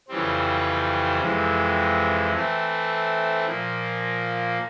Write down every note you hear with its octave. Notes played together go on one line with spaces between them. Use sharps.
F2 C#3 E3 G3 C4
F2 C3 E3 G#3
E3 A3 C4
A#2 F3 A#3